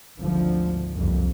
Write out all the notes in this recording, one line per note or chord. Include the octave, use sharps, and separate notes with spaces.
G#1 D2 D3 F3
F#1 C2 F2